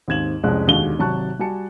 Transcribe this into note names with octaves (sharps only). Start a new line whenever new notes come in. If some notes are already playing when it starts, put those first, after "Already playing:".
D#2 G#2 C4 G#6 E7 F#7
C2 F2 G#3 C#4 F#6
E1 D#2 D3 G#3 F#4 G7
G#1 C3 F#3 A5 C#6 F#6
G3 F#4 G#5 A5 C#7